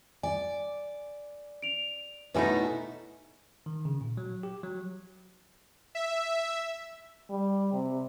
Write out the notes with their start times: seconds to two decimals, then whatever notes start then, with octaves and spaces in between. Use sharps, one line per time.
0.23 D5 G#5
1.62 D7 F7
2.34 B2 A3 D#4 E4 F#4 B4 C#5 G#5
3.66 D#3
3.85 C#3
4.01 A#2
4.17 F#3
4.43 G4
4.63 F#3
5.95 E5
7.29 G3
7.73 C3